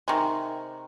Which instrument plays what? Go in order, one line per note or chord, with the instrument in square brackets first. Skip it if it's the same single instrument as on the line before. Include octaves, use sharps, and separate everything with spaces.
[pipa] C3 D#3 G#3